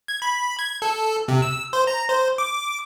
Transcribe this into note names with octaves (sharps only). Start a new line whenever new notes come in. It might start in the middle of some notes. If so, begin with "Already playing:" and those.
G#6
B5
G#6
A4
C3
E6
C5
A#5
C5
D6